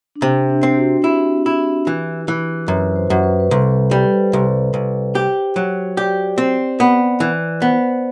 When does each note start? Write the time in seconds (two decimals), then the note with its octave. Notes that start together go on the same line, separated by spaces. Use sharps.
0.16 D4
0.22 C3 C4
0.50 D4
0.63 C4
0.77 F#4
1.04 E4 G4
1.46 E4
1.87 E3
2.28 E3
2.68 F#2 B4
2.96 C5
3.10 F#2
3.23 B4
3.40 B4
3.50 C2 A4
3.71 B4
3.91 G3 D5
4.02 B4
4.13 C5
4.33 C2
4.74 C2
5.15 G4
5.56 F#3
5.97 G4 D5
6.18 D5
6.38 C4 C5
6.80 B3 D5
7.20 E3
7.61 B3 C5